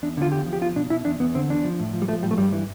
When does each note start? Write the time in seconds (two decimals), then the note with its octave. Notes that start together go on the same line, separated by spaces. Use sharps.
0.03 E2 D4
0.17 D3 F4
0.32 E2 G4
0.46 F3
0.53 G4
0.61 E2 F4
0.76 B2 D4
0.90 B2 E4
1.05 E2 D4
1.20 E2 B3
1.35 D3 C4
1.49 E2 D4
1.64 F3
1.80 A2
1.93 F3
2.02 G3
2.08 F3 A3
2.22 A2 G3
2.31 A3
2.37 G2 G3
2.53 E3